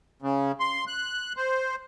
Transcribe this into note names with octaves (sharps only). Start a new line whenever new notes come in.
C#3
C6
F#6
C5